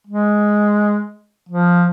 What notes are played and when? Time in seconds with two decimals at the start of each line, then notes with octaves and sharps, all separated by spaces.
0.07 G#3
1.49 F3